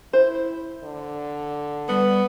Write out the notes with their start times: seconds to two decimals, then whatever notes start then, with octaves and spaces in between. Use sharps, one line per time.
0.13 E4 C5
0.84 D3
1.89 G3 B3